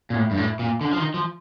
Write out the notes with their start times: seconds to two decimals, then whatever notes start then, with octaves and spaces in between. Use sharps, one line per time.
0.10 A#2
0.15 A2
0.31 G2
0.37 A2
0.59 A#2
0.81 D3
0.93 F3
0.98 D#3
1.14 F3